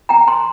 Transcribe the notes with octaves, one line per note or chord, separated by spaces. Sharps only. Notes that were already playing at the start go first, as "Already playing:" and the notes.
G5 A#5
A5 C6